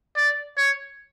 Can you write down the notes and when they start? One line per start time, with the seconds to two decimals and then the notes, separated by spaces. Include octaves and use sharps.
0.17 D5
0.58 C#5